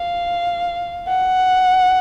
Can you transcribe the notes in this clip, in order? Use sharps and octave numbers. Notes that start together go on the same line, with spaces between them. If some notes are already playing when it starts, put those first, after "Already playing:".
Already playing: F5
F#5